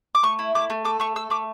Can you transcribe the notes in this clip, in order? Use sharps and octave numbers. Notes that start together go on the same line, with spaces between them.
D6
A3 C#6
E4
A3 D6
A3
A4 D6
A3 C#6
A4 E6
A3 D6